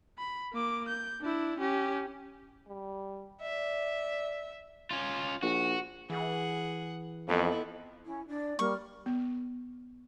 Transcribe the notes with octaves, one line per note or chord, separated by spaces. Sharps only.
B5
A#3 D6
G6
D4 E4
C#4 G4
G3
D5 E5
C#4 F4
A#1 F#4
E3 G#4 F#5
F2 B3 E4 A4 D#5
C#4 E4
D4 D5
G3 A#3 C#6 F6
B3